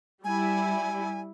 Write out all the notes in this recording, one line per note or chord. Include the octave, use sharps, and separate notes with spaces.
G3 E4 G#5